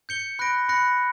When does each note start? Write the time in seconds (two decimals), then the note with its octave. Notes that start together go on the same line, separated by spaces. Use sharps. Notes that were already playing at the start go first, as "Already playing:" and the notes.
0.09 G6 C#7 G7
0.39 B5 F#6 A#6 D7
0.69 B5 F#6 A#6 C#7